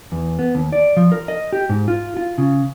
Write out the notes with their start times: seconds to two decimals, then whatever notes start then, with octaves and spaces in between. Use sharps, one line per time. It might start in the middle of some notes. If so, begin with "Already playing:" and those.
0.12 E2
0.39 B3
0.55 D#2
0.72 D5
0.97 F3
1.12 A#4
1.28 D#5
1.53 G4
1.69 G#2
1.88 F4
2.17 F4
2.38 C#3